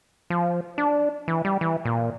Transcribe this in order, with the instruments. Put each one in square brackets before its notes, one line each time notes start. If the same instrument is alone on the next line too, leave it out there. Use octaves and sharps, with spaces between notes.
[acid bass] F3
D4
E3
G3
E3
A#2